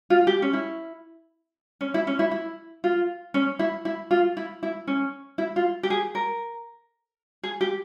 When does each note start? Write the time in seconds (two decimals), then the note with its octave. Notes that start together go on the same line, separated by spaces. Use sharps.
0.10 F4
0.27 G4
0.42 C#4
0.53 E4
1.81 C#4
1.94 E4
2.07 C#4
2.19 E4
2.31 E4
2.84 F4
3.34 C#4
3.59 E4
3.85 E4
4.11 F4
4.37 E4
4.63 E4
4.87 C#4
5.38 E4
5.56 F4
5.83 G4
5.90 G#4
6.15 A#4
7.43 G#4
7.61 G4